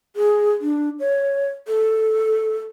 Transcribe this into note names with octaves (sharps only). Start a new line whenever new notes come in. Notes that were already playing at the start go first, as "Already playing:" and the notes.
G#4
D4
C#5
A4